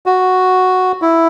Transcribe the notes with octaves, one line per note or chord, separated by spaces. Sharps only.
F#4
E4